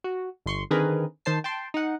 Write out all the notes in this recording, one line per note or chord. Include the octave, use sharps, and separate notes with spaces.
F#4
G1 C6 C#6
D3 D#3 C4 G#4 A#4 B4
D#3 C5 A5 C7
G5 A5 C6
D#4 F#5